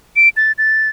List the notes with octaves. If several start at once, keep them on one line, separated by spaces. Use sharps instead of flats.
D7
A6
A6